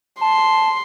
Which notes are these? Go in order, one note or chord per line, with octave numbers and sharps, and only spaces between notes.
A5 C6